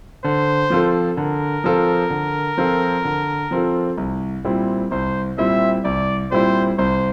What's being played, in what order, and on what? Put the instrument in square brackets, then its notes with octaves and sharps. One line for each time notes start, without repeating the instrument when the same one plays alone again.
[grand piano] D3 [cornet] C5
[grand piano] F3 C4 F4 A4
[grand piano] D3 [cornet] A#4
[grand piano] F3 C4 F4 A4
D3
F3 C4 F4 A4
D3
F3 C4 F4 A4
C2
A#2 G3 C4 E4
[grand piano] C2 [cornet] C5
[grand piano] A#2 G3 C4 E4 [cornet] E5
[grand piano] C2 [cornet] D5
[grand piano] A#2 G3 C4 E4 [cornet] C5
[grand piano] C2 [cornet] C5